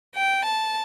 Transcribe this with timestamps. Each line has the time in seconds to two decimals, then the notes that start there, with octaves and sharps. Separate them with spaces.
0.14 G5
0.44 A5